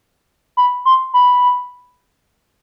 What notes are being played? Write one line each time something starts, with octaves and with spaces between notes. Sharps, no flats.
B5
C6
B5